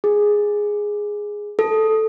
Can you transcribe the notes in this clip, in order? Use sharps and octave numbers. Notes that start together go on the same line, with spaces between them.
G#4
A4